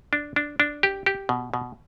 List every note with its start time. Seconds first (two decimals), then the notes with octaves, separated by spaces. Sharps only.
0.13 D4
0.36 D4
0.60 D4
0.83 G4
1.06 G4
1.29 B2
1.54 B2